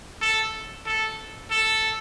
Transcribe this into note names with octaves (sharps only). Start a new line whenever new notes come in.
A4
A4
A4